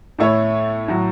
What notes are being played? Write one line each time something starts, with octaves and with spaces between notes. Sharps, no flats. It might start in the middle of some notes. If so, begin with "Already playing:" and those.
A2 A3 E4 A4 C#5
A2 F#3